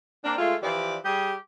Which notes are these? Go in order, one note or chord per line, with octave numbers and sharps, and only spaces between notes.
A#3 C4 D4
G#3 A3 F4
E3 F3 G4 D5
G3 G4 G#4